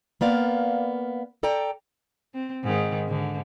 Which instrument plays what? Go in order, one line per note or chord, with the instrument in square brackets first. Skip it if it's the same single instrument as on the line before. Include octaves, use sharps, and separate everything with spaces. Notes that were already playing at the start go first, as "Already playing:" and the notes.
[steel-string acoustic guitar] A#3 B3 D5 F5
A4 D5 G5 A#5
[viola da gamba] C4
G#2 D#3
G#2 D3